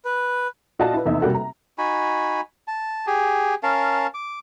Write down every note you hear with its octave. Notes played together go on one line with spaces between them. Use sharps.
B4
A#2 F#4 D5 D#5 F5 A5
E4 B4
F1 E2 D#4 E5
C3 G3 A#3 F#4 A4
A#5
D#4 F#4 G#5 B5
A5
G4 G#4
C#4 A#4 F5 A5
D6